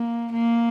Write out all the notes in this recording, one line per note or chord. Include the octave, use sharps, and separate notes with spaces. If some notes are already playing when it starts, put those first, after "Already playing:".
Already playing: A#3
A#3